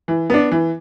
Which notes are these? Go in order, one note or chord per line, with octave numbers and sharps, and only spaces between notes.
E3
B3 D4
E3